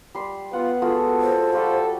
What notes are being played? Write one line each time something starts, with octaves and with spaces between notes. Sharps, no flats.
G3 C6
B3 F4 F#5
G#3 F4 F#4 A4
C5
G3 F4 F#4 A4